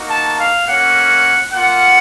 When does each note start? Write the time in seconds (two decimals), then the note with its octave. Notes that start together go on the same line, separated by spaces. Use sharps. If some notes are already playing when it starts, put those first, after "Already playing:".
Already playing: A#3 D#4 F#4
0.10 A5
0.38 F5
0.66 A#3 C#4 F#4 F#5
1.52 A#3 F4 F#5